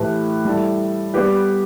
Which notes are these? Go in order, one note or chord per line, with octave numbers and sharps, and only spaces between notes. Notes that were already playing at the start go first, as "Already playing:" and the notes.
Already playing: A2 E3 A3 G4 B4
G3 E4 A4
G3 B3 G4 B4